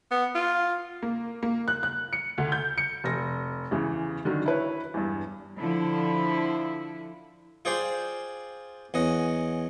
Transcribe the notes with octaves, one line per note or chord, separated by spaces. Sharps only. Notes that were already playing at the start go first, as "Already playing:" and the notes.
B3
F4
A#3
A#3
F#6
F#6
C#7
D2
G6
C#7
F1 A#6
E2 C#3 E3
D3 D#3 F#3
E4 B4 C#5
E2 G2
D3 F3 E4
F4 G#4 C5 D5 G5 C6
E2 C#4 D#5 F#5